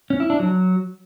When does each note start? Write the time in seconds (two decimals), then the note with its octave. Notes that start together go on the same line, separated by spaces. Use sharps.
0.10 C#4
0.20 E4
0.30 D4
0.40 F#3